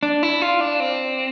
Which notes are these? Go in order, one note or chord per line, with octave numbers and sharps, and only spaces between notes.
D4
E4
F4
D4
C4